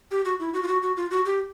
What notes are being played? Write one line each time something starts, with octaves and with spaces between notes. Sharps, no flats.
G4
F#4
E4
F#4
F4
F#4
F#4
F4
F#4
G4